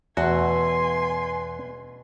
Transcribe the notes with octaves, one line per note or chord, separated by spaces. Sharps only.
E2 B2 A3 F#4 G#5 C6